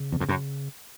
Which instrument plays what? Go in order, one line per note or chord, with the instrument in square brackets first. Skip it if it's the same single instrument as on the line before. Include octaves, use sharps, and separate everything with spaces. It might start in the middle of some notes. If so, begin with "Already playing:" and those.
Already playing: [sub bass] C#3
[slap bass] E2
F2
F#2